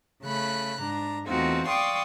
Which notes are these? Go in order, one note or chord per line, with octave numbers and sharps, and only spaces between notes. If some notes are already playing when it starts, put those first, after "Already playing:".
C#3 A3 B5 F#6
G#2 D4 A#5
E2 A3 C4 D#4 F4 F#4
D5 F5 G5 C6 C#6 D#6